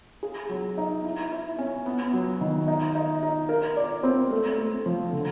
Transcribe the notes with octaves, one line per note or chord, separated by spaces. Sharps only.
G#4
F#3
D#4
E4
E4
C#4
B3
F#3
D#3
D#4
D#4
D#4
A#4
D5
C4
A3
A3
F3
D3